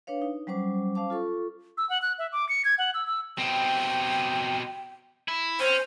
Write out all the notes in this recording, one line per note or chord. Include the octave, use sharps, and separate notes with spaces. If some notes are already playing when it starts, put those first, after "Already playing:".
D4 B4 C#5 F5
D#4
F#3 G3 C#4 C5 D6
C#4 C5 F5 A5 D6
F4 A4 C#6
E6
F#5
F#6
E5
D6
C#7
G#6
F#5
E6
E6
B2 C4 G5
E4
C#4 C5